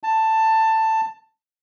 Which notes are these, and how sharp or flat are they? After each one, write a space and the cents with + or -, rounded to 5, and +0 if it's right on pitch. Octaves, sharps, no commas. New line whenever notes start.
A5 +10